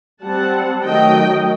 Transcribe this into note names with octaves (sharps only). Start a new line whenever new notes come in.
G3 C4 F#5 A5
D#3 F#3 A3 D#5 G5